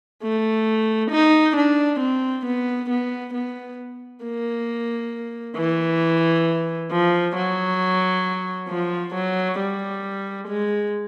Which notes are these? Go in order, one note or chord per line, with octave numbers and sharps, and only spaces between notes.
A3
D#4
D4
C4
B3
B3
B3
A#3
E3
F3
F#3
F3
F#3
G3
G#3